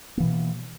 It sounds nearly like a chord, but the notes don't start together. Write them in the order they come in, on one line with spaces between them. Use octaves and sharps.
A#3 E3 B2